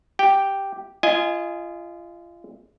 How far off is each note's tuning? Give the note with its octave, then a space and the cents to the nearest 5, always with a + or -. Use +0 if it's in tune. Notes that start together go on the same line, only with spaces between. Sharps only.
G4 +0 G5 +0
F4 -30 D#5 +0 G#5 +0